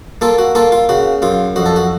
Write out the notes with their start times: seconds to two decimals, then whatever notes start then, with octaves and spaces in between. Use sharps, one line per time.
0.21 A#3 F4 A4
0.38 F#4
0.55 A#3 F4 A4
0.72 F4
0.89 C#3 F#4
1.22 F#2 F4
1.56 F2 F#4
1.66 A4
1.76 F#4